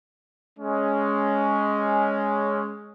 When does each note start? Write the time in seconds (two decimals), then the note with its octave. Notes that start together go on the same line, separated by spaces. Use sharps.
0.59 G#3 C#4